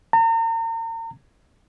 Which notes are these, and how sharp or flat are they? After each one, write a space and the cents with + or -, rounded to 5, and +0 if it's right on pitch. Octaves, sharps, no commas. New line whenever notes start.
A#5 -40